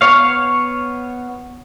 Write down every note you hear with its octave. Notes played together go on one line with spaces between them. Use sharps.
B3 C#5 F5